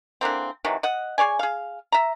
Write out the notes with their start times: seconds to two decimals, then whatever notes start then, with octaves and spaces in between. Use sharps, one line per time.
0.21 D3 E3 A#3 C4
0.65 C3 D#3 E3 F#3
0.83 D#5 F#5
1.18 G#4 C#5 D5 G#5
1.39 G#4 F5
1.92 E5 A#5